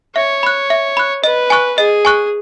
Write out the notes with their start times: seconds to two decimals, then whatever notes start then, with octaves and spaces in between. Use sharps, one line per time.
0.16 C#5 E5
0.43 B5 F#6
0.70 E5
0.97 B5 F#6
1.24 B4 D#5
1.50 G#5 C#6 F#6
1.78 G#4 D#5
2.05 G#5 C#6 F#6